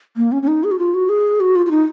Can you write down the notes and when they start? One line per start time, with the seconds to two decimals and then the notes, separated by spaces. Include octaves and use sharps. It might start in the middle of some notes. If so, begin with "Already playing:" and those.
0.17 A#3
0.32 C#4
0.43 C#4
0.48 D#4
0.64 G#4
0.71 F#4
0.79 F4
0.94 F#4
1.09 G#4
1.40 F#4
1.56 F4
1.66 F4
1.71 D#4